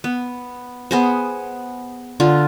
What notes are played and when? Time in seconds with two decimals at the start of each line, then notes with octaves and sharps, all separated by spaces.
0.04 B3
0.91 B3 G#4 C5
2.20 D3 F4